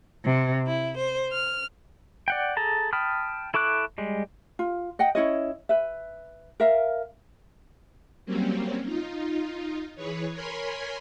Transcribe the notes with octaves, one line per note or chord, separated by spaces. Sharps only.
C3
E4
C5
F6
D5 F#5 G5
G#4 A4 A5 A#5
G5 A5 B5 D#6 F6
E4 A4 C#6 D6 F#6
G3 G#3
F4
D#5 F#5 G5
C#4 E4 C#5 D#5
B4 E5
A#4 E5 F5
F#3 G3 A#3 C4 C#4
D#4 F4
E3 G#4 B4 C#5
A#4 C#5 G#5 B5 C6